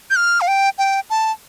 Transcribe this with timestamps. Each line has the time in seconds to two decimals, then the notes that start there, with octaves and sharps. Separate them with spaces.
0.10 G6
0.16 F6
0.41 F5
0.48 G5
0.78 G5
1.10 A5